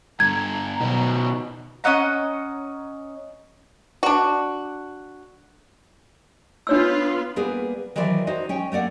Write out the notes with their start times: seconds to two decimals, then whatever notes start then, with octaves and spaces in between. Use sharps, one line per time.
0.20 G2 D3 A#5 G#6
0.81 B2 D#3 F#3
1.84 C#4 D#5 F#5 A#5
4.03 D4 F#4
6.67 B3 D4 F4 C#5 E6
7.36 G3 A#3 B3 G#4 B4
7.96 D#3 E3 F#3 E4 C5 D5
8.27 D#4 F#4 C5
8.49 C#4 C#5 G5
8.72 A3 A#3 D5 F#5